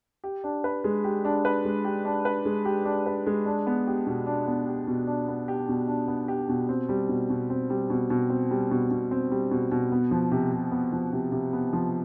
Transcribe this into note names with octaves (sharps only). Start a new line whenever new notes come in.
G4
D4
B4
G#3
G4
D4
B4
G#3
G4
D4
B4
G#3
G4
D4
B4
G#3
D4
B3
G4
B2
D4
B3
G4
B2
D4
B3
G4
B2
D4
B3
G4
B2
C4
G3
B2
B2
C4
G3
B2
B2
C4
G3
B2
B2
C4
G3
B2
B2
B3
F3
C3
C3
B3
F3
C3
C3
B3
F3